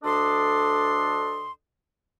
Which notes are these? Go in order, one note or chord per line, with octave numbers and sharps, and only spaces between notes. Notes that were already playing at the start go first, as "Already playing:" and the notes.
D2 D4 A4 D5 D#5 C6